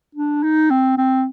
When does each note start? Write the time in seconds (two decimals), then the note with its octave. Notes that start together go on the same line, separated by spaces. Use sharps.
0.15 D4
0.43 D#4
0.70 C4
0.97 C4